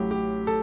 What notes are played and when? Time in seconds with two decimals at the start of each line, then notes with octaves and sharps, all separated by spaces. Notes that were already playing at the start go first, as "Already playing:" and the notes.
Already playing: A1 A2 F#3 G4
0.11 G4
0.47 A4